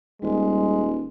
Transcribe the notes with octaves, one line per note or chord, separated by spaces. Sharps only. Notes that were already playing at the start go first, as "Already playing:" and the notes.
D#1 G3 G#3